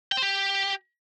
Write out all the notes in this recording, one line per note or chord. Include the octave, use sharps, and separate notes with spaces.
G5
C5
G4